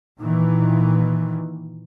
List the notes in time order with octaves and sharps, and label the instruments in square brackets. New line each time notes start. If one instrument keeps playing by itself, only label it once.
[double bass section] A#2 D#3 E3